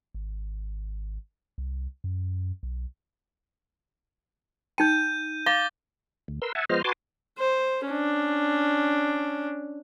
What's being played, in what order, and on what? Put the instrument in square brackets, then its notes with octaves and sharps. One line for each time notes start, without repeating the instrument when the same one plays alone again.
[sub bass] G#1
C2
F#2
B1
[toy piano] D#4 G5 [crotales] G6 D#7
[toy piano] F5 [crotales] D6 A6 G7
[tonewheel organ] D2
A#4 B4 C6 E6
E5 F#5 G#5 A5
F3 G#3 B3 C5 D#5 F6
F#4 B4 G#5 A5 C6 D6
[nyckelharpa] C5
C#4 D4